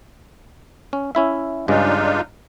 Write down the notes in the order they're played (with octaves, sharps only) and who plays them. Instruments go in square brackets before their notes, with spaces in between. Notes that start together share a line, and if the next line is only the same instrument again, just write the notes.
[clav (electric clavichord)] C#4
C#4 E4 E5
[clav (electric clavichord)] G2 C#3 G#3 [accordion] D4 D#4 F4